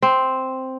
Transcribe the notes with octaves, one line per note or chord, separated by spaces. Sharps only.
C4